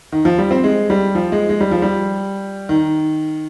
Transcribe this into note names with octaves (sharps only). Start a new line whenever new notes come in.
D#3
F3
G3
C4
G#3
G3
F3
G#3
G#3
G3
F3
G3
D#3